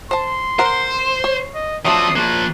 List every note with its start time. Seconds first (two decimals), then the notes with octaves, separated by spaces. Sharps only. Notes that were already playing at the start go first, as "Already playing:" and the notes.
0.11 C5 A5 C6
0.59 A#4 C5 F#5
1.24 C#5
1.54 D#5
1.85 F3 F#3 A3 C4 D4 D#6
2.16 F3 A#3 F#6